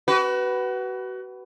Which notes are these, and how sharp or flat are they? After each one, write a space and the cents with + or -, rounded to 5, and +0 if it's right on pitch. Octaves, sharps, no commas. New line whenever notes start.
F#4 +30 B4 +0